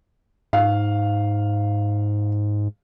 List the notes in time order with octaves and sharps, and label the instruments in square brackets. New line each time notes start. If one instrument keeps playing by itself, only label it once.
[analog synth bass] G#2 [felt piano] F5